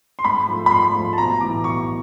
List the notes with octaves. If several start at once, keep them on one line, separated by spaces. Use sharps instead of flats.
C6
G#2 B5
F3 A3
B5
G#2 C6
F3 A3
A5
B1 A#5
A2 E3 D6
B1 C#6